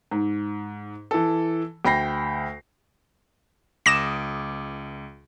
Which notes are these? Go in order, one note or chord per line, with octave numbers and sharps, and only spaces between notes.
G#2
E3 A4
D2 G5 B5 A#6 C7
C#2 D6 D#6 A#6 E7